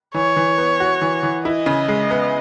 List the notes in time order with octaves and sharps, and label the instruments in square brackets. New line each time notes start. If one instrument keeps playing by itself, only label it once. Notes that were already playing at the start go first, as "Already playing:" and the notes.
[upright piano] E3 [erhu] C#5
[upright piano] E3
B3
F#4
E3
E3
[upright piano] E4 [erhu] D#5
[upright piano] C#3
G#3
B3